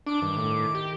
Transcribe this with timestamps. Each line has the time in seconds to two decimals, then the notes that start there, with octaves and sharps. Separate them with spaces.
0.06 D4 D6
0.22 G2 D#3
0.36 A2
0.75 G4